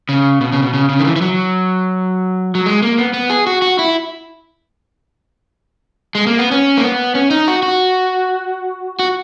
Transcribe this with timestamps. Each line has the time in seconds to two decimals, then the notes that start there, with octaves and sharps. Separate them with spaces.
0.09 C#3
0.41 B2
0.52 C#3
0.63 B2
0.74 C#3
0.89 C#3
0.99 D#3
1.05 E3
1.16 E3
1.22 F#3
2.55 F#3
2.66 G#3
2.82 A#3
2.98 B3
3.13 B3
3.30 G#4
3.47 F#4
3.62 F#4
3.79 E4
6.15 G#3
6.27 A#3
6.39 B3
6.51 C#4
6.77 A#3
6.84 B3
7.15 C#4
7.31 D#4
7.48 F#4
7.63 F#4
8.99 F#4